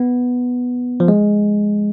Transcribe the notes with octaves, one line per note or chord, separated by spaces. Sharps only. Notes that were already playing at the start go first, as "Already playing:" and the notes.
Already playing: B3
F3
G#3